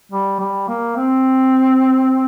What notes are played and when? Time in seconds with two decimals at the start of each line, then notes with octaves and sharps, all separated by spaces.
0.12 G3
0.39 G3
0.68 A#3
0.96 C4